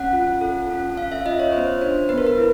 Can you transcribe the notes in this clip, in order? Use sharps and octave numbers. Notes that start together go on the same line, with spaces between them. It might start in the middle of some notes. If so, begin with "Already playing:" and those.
Already playing: C#4 F#5
F4
A4
C#4
C#4 F5
E5
F4 D#5
C#5
B3 C5
D4 C5
B3 B4
A#4
B4
E4